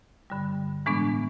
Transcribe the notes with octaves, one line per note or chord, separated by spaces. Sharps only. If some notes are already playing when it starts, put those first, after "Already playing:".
G2 D3 G3
A2 E3 G#3 B3 D4